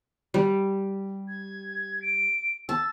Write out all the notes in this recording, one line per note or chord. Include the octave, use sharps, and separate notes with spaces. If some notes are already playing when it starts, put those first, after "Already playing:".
G3
G#6
D7
A5 E6